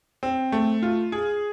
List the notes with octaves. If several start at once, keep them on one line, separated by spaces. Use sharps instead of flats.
C4
A3
F4
G#4